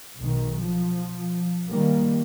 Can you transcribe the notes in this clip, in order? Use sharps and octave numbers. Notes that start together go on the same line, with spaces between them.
B1 D#3
F3
D#3 G3 A#3